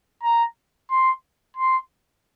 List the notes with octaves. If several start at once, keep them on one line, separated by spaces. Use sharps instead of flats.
A#5
C6
C6